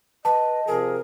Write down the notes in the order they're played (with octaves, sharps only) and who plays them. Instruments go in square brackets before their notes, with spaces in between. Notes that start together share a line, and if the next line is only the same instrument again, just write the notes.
[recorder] B4 [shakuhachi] D#5 [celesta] A5
[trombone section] C3 F3 G#4 [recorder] A#4